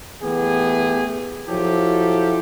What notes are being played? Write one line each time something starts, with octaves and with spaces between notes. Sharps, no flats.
E3 A3 B3 G4 G#4
F3 F#3 E4 G4 A4